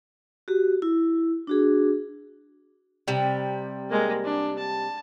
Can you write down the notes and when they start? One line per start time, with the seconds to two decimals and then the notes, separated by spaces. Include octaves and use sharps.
0.48 F#4 G4
0.82 E4
1.47 D4 F#4 G#4
3.08 C3 G3
3.89 G#3 A#3
4.24 D4
4.58 A5